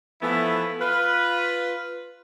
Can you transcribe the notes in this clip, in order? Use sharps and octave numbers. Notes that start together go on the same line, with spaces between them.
E3 F3 A3 B3 E4
F4 B4